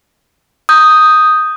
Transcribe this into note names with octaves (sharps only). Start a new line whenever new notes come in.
D#6 G6